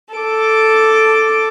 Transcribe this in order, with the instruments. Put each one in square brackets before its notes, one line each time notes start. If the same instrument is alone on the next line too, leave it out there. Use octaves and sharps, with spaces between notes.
[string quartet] A4 D6